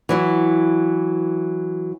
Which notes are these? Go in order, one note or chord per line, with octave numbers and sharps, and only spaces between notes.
E3 F#3 E4